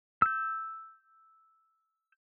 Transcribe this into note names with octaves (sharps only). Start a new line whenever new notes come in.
E6 G6